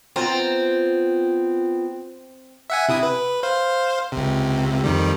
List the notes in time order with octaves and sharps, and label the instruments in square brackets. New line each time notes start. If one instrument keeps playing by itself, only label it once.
[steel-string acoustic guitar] B3 F4 A#5 [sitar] C4
[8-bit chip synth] E5 F#5 G#5
C3 E4 D#6
B4
C5 F5
C#2 C3
F2 D#3 G3